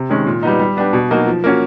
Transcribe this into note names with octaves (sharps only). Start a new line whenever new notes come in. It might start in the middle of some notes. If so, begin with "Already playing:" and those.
Already playing: C3
D#3 G#3 C#4
A#2
G3 B3 D#4
G3
B3 D4 G4
B2
F#3 A#3 D#4 F#4
F3
A#3 C#4 F#4